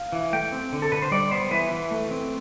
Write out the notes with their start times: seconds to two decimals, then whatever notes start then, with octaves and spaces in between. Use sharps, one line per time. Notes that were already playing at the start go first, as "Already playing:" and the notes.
Already playing: F5
0.12 E3
0.33 A3 G5
0.52 C4
0.72 D3
0.82 A4
0.92 D3 B4
1.02 C5
1.11 G3 D5
1.31 B3 C5
1.51 E3 B4
1.71 E3
1.91 A3
2.11 C4